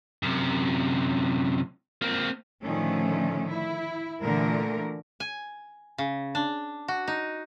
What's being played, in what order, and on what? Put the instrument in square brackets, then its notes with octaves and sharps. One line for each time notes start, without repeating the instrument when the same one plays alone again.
[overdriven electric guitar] F#2 C3
A#3 C4
[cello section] A2 D3 D#3 F3 A3 C#4
E4
A#2 D3 E3 A3 A#4
[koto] G#5
C#3
D4
F#4
D#4